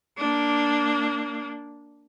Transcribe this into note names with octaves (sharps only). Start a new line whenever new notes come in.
A#3 D4